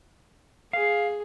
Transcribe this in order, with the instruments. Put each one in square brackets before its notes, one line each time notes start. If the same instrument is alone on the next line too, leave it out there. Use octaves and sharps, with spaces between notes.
[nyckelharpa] G#4 [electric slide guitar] F5